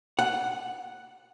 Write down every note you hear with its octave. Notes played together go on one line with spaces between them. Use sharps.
F#5